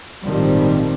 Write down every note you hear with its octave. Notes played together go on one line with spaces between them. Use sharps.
G#1 A#2 D#3 F3 G3 C4